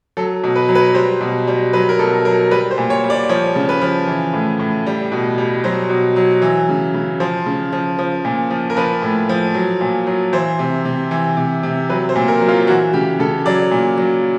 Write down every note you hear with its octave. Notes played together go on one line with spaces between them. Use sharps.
F#3 A4
B2
B4
F#3
B4
G3 C5
B2
G3
F#3 B4
A#4
B2 A4
F#3 A#4
G3 B4
C5
A#2
C#5
G3
D5
F3 C#5
C#3
B4
F3
E3
A2
A2
G3
B2
G3
F#3 C5
B2
F#3
E3
C#3
C#3
F3 C5
C#3
F3
F3
A#2
F3
A#4
F3 B4
A2
F3
F#3
A#2
F#3
E3 C5
C3
C3
E3
C3
C3
F#3 B4
C5
A#2
A#4
F#3
F4
E3 F#4
C#3 G4
C#3 A4
F#3 D5
A#2
F#3